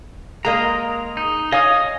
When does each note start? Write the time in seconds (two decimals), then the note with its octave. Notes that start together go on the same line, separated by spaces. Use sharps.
0.45 G#3 A#3 D#5 A#5
1.17 D#4
1.52 C#5 D#5 F5 G#5 D#6